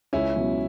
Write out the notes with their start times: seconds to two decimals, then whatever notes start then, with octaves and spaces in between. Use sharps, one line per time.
0.13 C#2 C#4 E4
0.35 B2 F#3